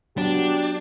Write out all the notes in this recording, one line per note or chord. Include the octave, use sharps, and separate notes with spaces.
F#3 B3 D4 G4